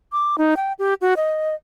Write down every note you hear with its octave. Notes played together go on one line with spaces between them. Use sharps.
D6
D#4
G5
G4
F#4
D#5